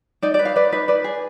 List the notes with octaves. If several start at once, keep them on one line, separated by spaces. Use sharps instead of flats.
D#4 D5
B4 D5
F5
B4 D5
D#4 B4
B4 D5
G#4